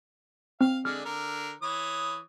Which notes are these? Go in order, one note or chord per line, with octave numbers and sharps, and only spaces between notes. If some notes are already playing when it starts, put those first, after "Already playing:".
C4 F5
D3 G#3 D5 F6
D3 A#4
E3 C#5 D#6